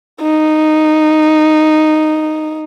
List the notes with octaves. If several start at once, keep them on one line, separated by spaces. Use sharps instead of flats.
D#4